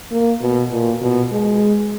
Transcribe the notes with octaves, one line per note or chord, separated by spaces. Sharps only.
A#3
B2
A#2
B2
G#3